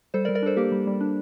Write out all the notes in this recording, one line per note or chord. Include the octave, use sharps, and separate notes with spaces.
G3 A4 C5
A#4 D5
G3
A#4 D5
D4 A4 C5
A#3 G4 A#4
G3
G3
D4